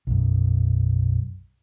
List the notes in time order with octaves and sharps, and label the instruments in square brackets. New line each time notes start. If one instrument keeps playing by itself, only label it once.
[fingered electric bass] B1 F#2